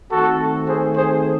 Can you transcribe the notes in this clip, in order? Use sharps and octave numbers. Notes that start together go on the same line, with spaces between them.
D#3 A3 C4 F#4 A4
G#4 C5
G#4 C5